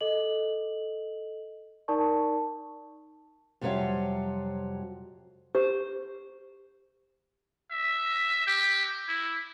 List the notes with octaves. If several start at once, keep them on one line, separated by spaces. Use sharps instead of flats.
A4 D#5 F#7
D#4 A#4 D5 A5 C#6
F2 C3 F#3 G3 C#5 F5
G4 C5
E5
G4
E4